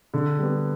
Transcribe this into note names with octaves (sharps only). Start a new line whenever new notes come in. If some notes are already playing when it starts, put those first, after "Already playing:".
D3
G3 B3